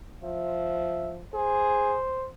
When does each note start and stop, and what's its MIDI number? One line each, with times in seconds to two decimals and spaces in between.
0.24 1.22 53
0.24 1.13 76
1.34 1.95 68
1.34 2.29 72